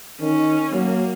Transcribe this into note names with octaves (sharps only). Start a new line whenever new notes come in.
D#3 C#4
F#3 A#3